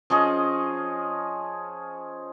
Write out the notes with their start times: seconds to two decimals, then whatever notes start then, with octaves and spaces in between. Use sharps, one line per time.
0.10 F3 C#4 G#4 D#5